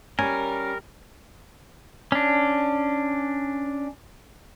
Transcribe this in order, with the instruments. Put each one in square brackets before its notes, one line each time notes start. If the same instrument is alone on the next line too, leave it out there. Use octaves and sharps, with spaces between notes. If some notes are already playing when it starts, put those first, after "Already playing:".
[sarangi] G3 [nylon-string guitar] C#4 [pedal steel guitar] A#4 [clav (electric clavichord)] G#5
[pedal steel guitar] C#4 D4